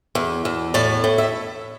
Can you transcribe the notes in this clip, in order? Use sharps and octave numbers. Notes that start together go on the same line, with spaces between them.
E2
E2
A2 D5
A2
E5